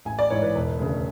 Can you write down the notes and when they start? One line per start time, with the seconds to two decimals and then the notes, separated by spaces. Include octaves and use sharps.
0.05 A1 G#5
0.19 D5
0.30 G#2 E3 C#5
0.42 B4
0.55 E1
0.79 D2 C#3